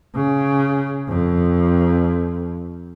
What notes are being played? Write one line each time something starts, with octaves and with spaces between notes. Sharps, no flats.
C#3
F2